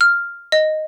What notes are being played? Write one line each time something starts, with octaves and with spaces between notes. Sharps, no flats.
F6
D#5